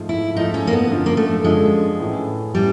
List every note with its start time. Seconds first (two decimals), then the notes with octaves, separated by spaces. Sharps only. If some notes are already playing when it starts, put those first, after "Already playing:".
Already playing: G#2 F3 A3
0.09 E4
0.35 G#2 F3 A3 D#4
0.54 C#4
0.67 A#3
0.73 B3
0.90 F#2 D3 F3
1.06 A#3
1.17 A3
1.44 F#2 D3 F3 G#3
1.99 A2 E3 A3 C#4
2.54 A2 E3 G3 A3 C#4